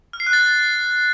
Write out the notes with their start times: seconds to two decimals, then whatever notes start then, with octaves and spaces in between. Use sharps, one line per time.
0.13 F6
0.20 C7
0.27 F#6
0.33 A6